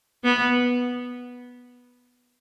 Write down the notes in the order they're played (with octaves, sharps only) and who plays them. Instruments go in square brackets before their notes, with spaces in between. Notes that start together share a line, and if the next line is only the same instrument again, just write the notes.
[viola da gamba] B3